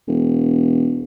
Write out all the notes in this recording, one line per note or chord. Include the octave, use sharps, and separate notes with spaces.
E1